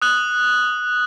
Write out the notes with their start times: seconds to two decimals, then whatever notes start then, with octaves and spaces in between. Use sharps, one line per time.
0.02 D#6 F#6 F#7